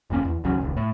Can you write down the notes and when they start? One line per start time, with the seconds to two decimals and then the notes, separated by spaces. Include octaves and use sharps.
0.10 G1 F2 A#3 C#4
0.25 E2
0.44 G#1 C#2 F#3 C#4
0.60 D#1 C#2
0.77 A2